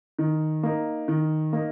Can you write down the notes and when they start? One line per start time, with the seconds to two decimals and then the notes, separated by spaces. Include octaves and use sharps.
0.19 D#3
0.63 A#3 D#4
1.08 D#3
1.53 A#3 D#4